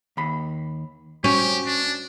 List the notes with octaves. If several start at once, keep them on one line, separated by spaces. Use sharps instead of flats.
D#2 B5
C#4 F#4 G4
D4